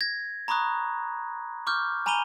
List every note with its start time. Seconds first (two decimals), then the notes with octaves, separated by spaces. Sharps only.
0.01 G#6 A#6
0.48 A#5 B5 C#6 D#6 F#6
1.67 C#6 D6 F6 G6
2.06 G#5 A#5 B5 D#7 F7 G7